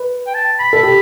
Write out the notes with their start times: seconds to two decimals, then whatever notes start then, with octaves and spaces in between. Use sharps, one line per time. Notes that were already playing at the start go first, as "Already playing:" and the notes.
Already playing: B4
0.27 G5
0.34 A5
0.60 B5
0.73 A4
0.83 G4